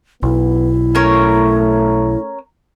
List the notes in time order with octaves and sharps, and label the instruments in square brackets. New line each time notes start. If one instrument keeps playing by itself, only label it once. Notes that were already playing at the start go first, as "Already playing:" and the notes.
[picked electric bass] B1 [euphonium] B3 [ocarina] E4
[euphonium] A3 [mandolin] C#4 A#4 C#5